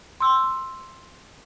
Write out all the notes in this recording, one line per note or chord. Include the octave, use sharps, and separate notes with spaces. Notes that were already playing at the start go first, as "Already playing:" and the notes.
C6 E6